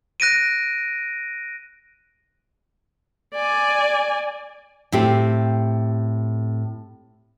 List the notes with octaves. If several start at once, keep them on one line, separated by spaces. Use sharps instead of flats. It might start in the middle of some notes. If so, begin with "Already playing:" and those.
F#6 A#6 D7 D#7
D5 G#5
A2 C4 G4